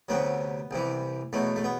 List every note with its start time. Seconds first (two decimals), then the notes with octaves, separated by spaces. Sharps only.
0.09 D2 C3 F#3 B3
0.71 C2 C3 E3
1.33 E2 B2 F#3 A3
1.56 A3
1.64 B3